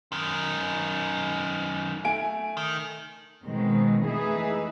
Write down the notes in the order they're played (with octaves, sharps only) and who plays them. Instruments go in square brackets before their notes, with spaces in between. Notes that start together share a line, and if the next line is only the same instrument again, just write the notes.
[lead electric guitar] F#2 D#3
[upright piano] A3 G#5 D7
[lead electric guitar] D#3
[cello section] B2 D#3 G#3 C4
E3 A3 D#4 G#4 B4 E5